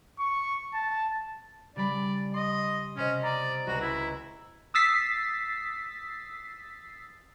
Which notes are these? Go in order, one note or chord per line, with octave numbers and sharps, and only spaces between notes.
C#6
A5
C#3 G3 D5 B5
D#5 C6
C3 C#4 C5 D#5
D5 A#5
C#2 F#4 A#5
E4
D#6 E6 A6 B6 C7